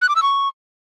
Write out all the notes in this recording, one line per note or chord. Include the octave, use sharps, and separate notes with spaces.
F#6
D6
E6
C#6